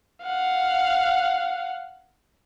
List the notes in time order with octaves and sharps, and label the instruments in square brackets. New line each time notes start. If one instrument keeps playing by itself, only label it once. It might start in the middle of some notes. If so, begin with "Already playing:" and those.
[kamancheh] F5 F#5